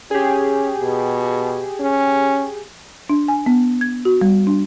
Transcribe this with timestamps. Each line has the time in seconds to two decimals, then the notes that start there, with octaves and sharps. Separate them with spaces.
0.11 C#4 G4 G#4
0.80 B2
1.80 C#4
3.09 D4
3.28 G#5
3.46 B3
3.81 G#6
4.05 F#4
4.21 G3
4.47 D4